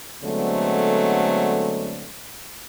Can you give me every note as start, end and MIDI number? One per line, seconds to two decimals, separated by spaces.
0.24 2.09 50
0.24 2.09 54
0.24 2.09 56
0.24 2.09 57
0.24 2.09 59
0.24 2.09 60